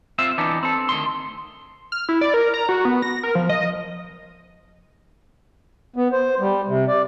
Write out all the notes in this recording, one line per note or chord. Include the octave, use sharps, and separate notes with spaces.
C4 F4 E5
E3 B3 D4 D#4
C4 A4
D2 D#3 C6
F6
E4
D5
A#4
A#5
F#4
B3
A#6
A#4
F3
D#5
B3
C5
G3
C3
D5